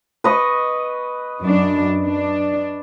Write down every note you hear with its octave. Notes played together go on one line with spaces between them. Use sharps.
B4 D#5 C#6
F#2 D4
D4